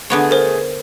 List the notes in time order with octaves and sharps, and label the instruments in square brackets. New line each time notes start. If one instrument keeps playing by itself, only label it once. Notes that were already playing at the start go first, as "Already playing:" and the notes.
[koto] D3 B3 C#5 [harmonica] A3 G#4
[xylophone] A#4 C5